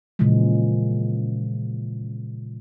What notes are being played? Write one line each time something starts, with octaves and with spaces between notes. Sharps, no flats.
A#2 C#3 E3 F3 G#3